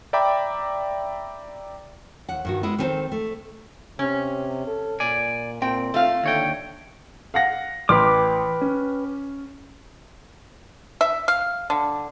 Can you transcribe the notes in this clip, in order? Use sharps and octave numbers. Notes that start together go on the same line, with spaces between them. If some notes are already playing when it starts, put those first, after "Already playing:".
D5 E5 G5 A#5 B5 D6
D#2 F#5
G2 D#3 F#4
G#3 B3 E4
D#3 B3 C4 G#4 A4 C5
A3
C3 C#4
A4
A#2 D5 G#5
A#2 C4 G5
A3 F4 F5
D#2 D3 C#5 G5
F5 F#5 A#6
A1 B4 G5 C6 D6 F6
C#4
E5
F5
D3